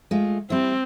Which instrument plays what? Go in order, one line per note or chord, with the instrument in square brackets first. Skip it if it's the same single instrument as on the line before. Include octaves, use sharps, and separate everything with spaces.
[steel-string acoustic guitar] G#3 A3 F4
[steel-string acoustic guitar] G3 E4 [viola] C4